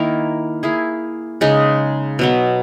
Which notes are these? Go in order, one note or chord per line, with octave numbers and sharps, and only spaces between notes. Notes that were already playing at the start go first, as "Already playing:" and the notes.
Already playing: D#3 A#3 E4 A#4
A#3 E4 G#4
C#3 G#3 D#4
B2 F#3 B3